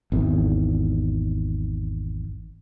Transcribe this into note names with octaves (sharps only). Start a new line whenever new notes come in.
G#1 E2